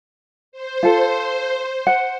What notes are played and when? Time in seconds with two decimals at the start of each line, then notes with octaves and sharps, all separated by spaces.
0.52 C5
0.83 F4 A4
1.87 F#5